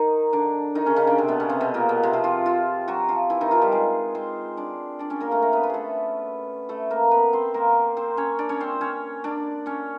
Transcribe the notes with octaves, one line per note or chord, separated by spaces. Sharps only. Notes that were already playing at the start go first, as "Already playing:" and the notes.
Already playing: D#3 D#4
D3 D4
D#3 D#4
C#3 C#4
C#3 C#4
D3 D4
C3 C4
B2 B3
C#3 C#4
C3 C4
B2 B3
A#2 A#3
B2 B3
C3 C4
F3 F4
F3 F4
F3 F4
F#3 F#4
F3 F4
E3 E4
D#3 D#4
F3 F4
G3 G4
G#3 G#4
C4 C5
D4 D5
D4 D5
C#4 C#5
A#3 A#4
A3 A4
A#3 A#4
B3 B4
B3 B4
A3 G#4 A4
A3 A4
A#3 A#4
B3 B4
C4 C5
A#3 A#4
C4 C5
C#4 C#5
D4 D5
C#4 C#5
C4 C5
C#4 C#5
D4 D5
C#4 C#5